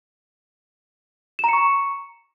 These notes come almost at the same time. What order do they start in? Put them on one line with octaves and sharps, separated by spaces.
E7 A#5 C#7 C#6